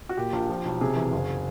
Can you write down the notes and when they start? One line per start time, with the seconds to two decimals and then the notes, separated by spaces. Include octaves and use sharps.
0.09 F#4
0.17 A#2 G4
0.33 A#1
0.49 F3
0.65 B1
0.81 C3 G#4
0.96 E3
1.12 F#1